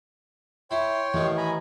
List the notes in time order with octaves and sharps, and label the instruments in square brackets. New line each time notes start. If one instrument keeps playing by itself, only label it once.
[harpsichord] E4 [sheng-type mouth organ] C#5 G5 C6
[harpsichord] A1 D#3 [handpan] E3
[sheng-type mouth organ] G#5 A#5 B5